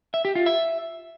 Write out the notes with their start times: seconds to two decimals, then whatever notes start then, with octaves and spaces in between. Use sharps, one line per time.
0.14 E5
0.25 G4
0.35 F4
0.46 E5